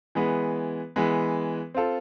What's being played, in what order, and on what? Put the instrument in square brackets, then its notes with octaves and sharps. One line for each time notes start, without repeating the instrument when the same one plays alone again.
[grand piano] E3 G#3 B3
E3 G#3 B3
C4 F4 A4